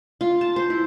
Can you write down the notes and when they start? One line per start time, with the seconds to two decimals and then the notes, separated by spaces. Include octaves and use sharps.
0.21 F4
0.41 A5
0.56 C5
0.70 E4